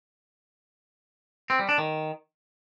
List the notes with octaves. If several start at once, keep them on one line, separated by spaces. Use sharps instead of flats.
C4
G3
D4
D#3